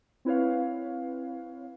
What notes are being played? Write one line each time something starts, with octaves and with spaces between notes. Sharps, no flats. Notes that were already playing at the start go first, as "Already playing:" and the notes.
C4 E4 B4 C#5 F5